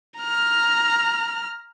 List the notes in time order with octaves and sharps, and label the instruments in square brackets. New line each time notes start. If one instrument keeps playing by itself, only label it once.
[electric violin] A#5 F6